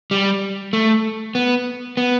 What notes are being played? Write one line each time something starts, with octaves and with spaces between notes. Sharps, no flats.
G3
A3
B3
B3